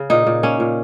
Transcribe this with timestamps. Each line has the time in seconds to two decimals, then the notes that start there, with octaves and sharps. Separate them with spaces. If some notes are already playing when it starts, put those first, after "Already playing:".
Already playing: C#3
0.10 A#2 D#4
0.27 A#2
0.43 A#3 C#4
0.60 A#2